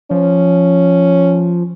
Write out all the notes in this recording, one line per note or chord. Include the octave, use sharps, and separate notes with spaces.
F3 C#4